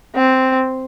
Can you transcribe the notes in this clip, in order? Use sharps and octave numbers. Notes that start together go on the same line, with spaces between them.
C4